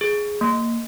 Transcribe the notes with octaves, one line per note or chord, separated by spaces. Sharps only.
G#4
A#3